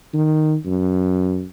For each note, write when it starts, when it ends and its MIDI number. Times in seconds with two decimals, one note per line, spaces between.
0.14 0.56 51
0.65 1.45 42